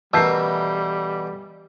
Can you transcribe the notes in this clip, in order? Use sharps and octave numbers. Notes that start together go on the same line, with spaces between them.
B2 E3 G3 A3 A#4 E6 G6 C7